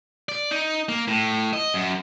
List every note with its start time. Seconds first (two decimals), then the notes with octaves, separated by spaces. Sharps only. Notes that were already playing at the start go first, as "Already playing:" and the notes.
0.29 D5
0.51 D#4
0.89 A#3
1.08 A2
1.53 D#5
1.74 F#2